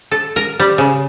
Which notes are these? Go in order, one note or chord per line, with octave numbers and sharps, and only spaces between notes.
A4
A#4
G3
C#3